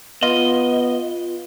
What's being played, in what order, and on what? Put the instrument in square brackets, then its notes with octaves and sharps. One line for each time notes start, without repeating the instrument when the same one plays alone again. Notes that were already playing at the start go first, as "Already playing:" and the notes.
[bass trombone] B3 [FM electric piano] F4 [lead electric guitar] D#5